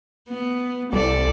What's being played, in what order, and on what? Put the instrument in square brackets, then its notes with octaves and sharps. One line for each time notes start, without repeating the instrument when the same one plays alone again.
[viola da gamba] B3
[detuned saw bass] C2 [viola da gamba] A4 D5